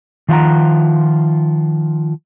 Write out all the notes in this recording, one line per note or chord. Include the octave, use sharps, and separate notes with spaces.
D#3 F3 F4 F5 F#5 A#5